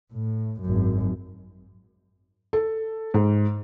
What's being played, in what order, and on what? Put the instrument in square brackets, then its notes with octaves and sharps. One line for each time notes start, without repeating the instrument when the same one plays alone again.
[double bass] A2
G#1 F#2
[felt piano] A4
G#2